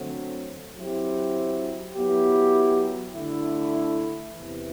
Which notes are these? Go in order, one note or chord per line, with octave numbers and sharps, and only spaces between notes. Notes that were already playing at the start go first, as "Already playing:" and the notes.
Already playing: D3 F#3 A3 C4
F#3 C4 E4 G4
F#3 B3 E4 G4
D3 A3 E4
E2 C3 E3